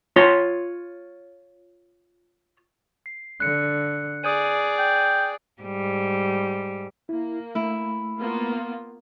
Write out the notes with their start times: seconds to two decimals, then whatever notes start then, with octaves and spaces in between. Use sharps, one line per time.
0.16 F4 C#5 C6
3.06 C7
3.40 D3 F#6 C#7
4.24 G#4 D5 D#6 G6 D#7
4.79 G5
5.62 G#2 G3
7.09 A#3 E4
7.55 A3 E4
8.18 A#3 B3 F4